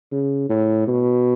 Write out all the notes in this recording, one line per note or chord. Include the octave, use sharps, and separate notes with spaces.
C#3
A2
B2